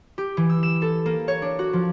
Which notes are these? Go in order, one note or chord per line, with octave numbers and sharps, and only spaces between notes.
G4
E3
E6
E7
A4
A#3
C#5
D4
F#4
F3